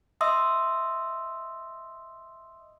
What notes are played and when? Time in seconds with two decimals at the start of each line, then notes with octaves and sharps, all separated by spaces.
0.21 D#5 E5 C6 D#6 E6